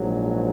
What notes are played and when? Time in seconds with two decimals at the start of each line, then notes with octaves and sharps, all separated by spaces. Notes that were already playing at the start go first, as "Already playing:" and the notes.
Already playing: A#1 G#2 F#3